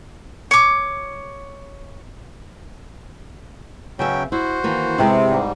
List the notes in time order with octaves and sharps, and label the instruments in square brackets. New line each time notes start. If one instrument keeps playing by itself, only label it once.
[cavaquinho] C#5 D6
[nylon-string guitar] C#3 B3 E5 [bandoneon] F#3 C#4 G5
[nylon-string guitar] E4 [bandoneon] F#4 C5
[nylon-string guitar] D#3 E3 A#3
[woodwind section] C3 [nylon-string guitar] G#3 B3 E4
[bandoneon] G#2 G3